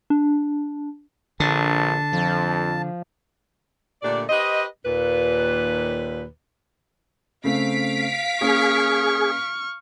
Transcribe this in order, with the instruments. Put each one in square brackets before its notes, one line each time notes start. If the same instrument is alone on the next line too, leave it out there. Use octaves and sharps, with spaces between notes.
[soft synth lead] D4
[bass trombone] A#1 [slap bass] D3 [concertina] A5
[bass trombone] F2 [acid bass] F3
[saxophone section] A#2 D3 A3 D4 G4 D5
G4 B4 C5 D#5
D#2 A#2 B4
[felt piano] C#3 A3 C4 [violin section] F5 B6 D7
[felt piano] A#3 C#4 [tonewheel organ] G#4 [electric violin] C#6 F6